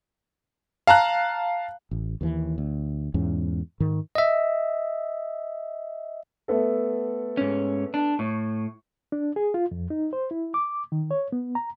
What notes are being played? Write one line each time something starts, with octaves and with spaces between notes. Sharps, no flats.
F5 A5 A#5 F#6
A1
D#2 E3
D2
E2 G#2 C#4
G#2 D#3
D#5 E5
A3 B3 A4
G#2 C#4
D4
A2 C#6
D4
G#4
F4
F2
D#4
C5
E4
D6
D#3
C#5
B3
A#5